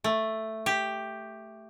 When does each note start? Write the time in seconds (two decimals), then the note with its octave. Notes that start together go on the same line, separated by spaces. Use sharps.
0.04 A3
0.66 G4